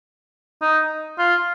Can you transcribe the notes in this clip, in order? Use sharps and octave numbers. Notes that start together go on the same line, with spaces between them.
D#4
F4